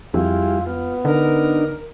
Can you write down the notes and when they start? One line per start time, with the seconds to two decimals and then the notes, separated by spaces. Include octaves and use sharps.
0.14 F2 G3 G#3 E4 F4
0.66 B3 F4
1.05 D3 D4 D#4 A#4